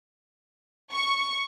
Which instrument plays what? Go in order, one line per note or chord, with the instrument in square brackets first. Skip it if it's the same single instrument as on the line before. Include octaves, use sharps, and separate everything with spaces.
[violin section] C#6